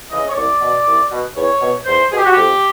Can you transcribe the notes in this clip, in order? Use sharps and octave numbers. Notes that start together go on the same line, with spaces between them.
C#3 E3 D#5
C#5
C2 D5
B2
C2
B2
E2 C#5
B2
E2 C5
B2 G#4
G4
F#4
F2 G4